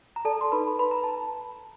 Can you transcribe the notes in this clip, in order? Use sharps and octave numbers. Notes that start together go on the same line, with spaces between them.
A#5
A4 D5 A5
C6
D#4 B4 B5
B4 B5
A#5
A5